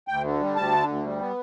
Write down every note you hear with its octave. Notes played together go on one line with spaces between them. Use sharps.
D2 G5
D3
G3
D2 A5
D3
D2
G3
B3